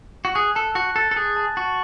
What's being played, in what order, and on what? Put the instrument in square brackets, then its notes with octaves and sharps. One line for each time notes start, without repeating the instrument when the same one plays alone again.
[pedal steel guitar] F#4
[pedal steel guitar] G#4 [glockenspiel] F#6
[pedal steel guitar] A4 [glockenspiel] A5
[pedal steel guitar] F#4 [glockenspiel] F#6
[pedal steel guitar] A4 [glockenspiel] A6
[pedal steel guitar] A4
[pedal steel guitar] G#4 [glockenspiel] F#6
[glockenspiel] A5
[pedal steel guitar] F#4 [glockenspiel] A5